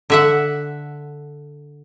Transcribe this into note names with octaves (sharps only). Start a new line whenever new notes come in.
D3 E5 F#5